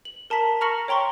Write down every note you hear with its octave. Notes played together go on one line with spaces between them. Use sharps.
F#7
A#4 A5 A#5 B6 F#7
A#5 C#6 F6 A#6 C#7 F#7
C#5 G5 A#5 C6 C#6